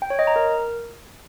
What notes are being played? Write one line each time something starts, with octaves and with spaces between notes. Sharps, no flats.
G5
C#5
D#5
A#5
A#4